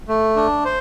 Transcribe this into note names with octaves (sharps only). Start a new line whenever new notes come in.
A3
D4
C5